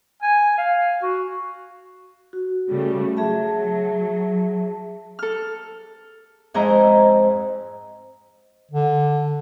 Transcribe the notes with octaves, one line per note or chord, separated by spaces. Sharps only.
G#5
F5
F#4
F#4
C#3 G3 A3
F#3 G#4 E5 A5
A4 F6
F2 G#2 E4 C5 D#5 A#5
D3